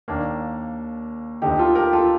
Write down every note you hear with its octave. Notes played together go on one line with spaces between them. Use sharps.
D#2 D#3 A#3 D4
D2 D3 D#4 G4
F4 A4
G4 A#4
F4 A4